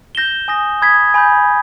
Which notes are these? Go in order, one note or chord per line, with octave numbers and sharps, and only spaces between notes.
G6 A#6 E7 G7
G#5 D#6 A#6
B5 D#6 G#6 B6
G#5 B5 G6